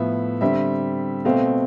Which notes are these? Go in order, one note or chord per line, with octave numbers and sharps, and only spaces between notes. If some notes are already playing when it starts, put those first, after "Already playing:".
Already playing: A2 F3 B3 E5
D3 G3 C4 E5
B2 A3 C4 F5